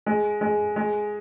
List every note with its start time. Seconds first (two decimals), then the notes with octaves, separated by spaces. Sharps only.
0.06 G#3
0.41 G#3
0.76 G#3